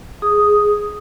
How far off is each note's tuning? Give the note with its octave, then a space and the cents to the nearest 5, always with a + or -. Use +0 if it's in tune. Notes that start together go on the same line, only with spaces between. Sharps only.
G#4 +0 D#6 +0